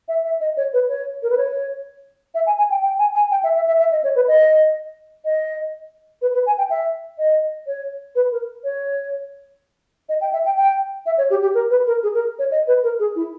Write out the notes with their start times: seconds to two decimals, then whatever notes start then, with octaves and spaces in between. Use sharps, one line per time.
0.08 E5
0.24 E5
0.41 D#5
0.57 C#5
0.73 B4
0.89 C#5
1.23 A#4
1.30 B4
1.37 C#5
2.34 E5
2.46 G#5
2.58 G#5
2.70 G5
2.83 G5
2.99 G#5
3.15 G#5
3.31 G5
3.43 E5
3.55 E5
3.67 E5
3.79 E5
3.92 D#5
4.04 C#5
4.15 B4
4.28 D#5
5.25 D#5
6.22 B4
6.34 B4
6.46 G#5
6.58 G5
6.70 E5
7.18 D#5
7.67 C#5
8.15 B4
8.32 A#4
8.64 C#5
10.09 D#5
10.21 G5
10.33 E5
10.45 G5
10.57 G5
11.06 E5
11.18 C#5
11.30 G4
11.42 G4
11.54 A#4
11.70 B4
11.87 A#4
12.03 G#4
12.14 A#4
12.39 C#5
12.51 D#5
12.67 B4
12.83 A#4
12.99 G#4
13.16 E4